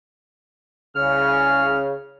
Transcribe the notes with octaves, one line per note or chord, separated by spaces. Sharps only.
C2 C#3 C#5 F6